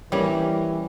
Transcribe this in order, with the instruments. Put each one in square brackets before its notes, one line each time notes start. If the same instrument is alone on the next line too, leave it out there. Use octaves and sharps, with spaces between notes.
[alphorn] E3 [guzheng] G3 [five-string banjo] A#3 C#4